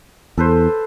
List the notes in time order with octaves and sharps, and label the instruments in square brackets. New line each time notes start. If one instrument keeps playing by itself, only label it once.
[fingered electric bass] E2 [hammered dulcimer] A4 B4 C5